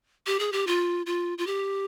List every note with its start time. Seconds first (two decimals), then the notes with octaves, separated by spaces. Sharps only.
0.27 G4
0.39 G#4
0.52 G4
0.67 F4
1.06 F4
1.38 F4
1.47 G4